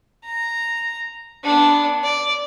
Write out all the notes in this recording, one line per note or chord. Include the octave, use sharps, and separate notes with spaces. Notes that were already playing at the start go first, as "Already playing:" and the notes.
A#5
B3 D4
D5